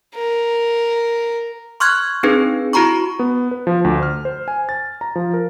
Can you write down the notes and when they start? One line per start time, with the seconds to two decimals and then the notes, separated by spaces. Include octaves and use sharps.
0.15 A#4
1.80 C6 C#6 F6 F#6 G#6
2.23 C4 D4 D#4 G#4 B4
2.73 E4 F#4 A#5 B5 C#6
3.19 B3
3.51 B4
3.67 F3
3.85 D2
4.03 F6
4.25 C5
4.48 G#5
4.69 A6
5.01 A#5
5.16 F3
5.34 A#4